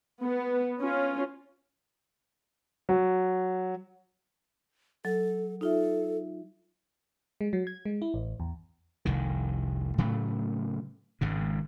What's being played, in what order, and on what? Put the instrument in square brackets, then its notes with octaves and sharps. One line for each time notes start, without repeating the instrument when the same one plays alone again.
[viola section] B3
C#4 F4
[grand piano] F#3
[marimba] F#3 [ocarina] A4
[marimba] D#4 F4 E5 [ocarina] A4
[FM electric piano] G#3
F#3
G#6
G#3
E4
A1
E2
[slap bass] F1 C2 D#3
A2 C#3 F#3 A3
G#1 G#2 C#3